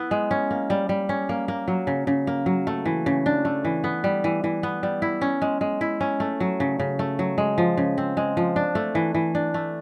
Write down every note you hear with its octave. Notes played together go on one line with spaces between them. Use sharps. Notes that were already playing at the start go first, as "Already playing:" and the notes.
Already playing: B3 E4
G#3
C#4
A#3
G3
G3
C#4
A#3
A#3
F#3
C#3
C#3
A#3
F#3
A3
E3
C#3
D4
A3
E3
B3
G3
E3
E3
B3
G3
E4
C#4
G#3
G#3
E4
C#4
A3
F#3
C#3
C#3
A3
F#3
G#3
F3
C#3
C4
G#3
F3
D4
A3
E3
E3
D4
A3